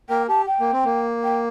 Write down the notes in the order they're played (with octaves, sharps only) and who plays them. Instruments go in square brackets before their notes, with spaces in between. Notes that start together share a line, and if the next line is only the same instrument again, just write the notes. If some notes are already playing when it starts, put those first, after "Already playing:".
[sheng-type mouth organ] A#3 A#4 [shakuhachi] G5
[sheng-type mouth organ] G4 [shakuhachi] A5
[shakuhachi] G5
[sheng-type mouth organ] A#3
C4
A#3
[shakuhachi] G5